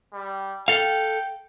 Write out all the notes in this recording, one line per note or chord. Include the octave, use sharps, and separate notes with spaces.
G3
A4 F5 G5